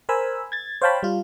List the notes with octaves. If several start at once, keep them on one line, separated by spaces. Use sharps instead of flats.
A#4 C5 G#5 B5 E6
G#6 A6
C5 C#5 F5 G5 A5 B5
G3 F4